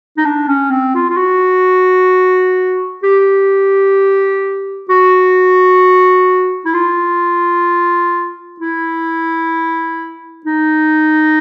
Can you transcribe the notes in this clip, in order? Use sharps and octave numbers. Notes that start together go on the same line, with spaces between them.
D#4
D4
C#4
C4
F4
F4
F#4
G4
F#4
E4
F4
E4
D#4